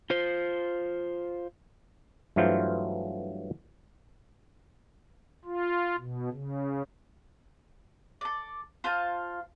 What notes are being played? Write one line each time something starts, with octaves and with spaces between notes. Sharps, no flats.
F4 C5
G2 E3 F#3 A3 F4 C5
F4
B2
C#3
A4 D5
F4 C5 F5 A5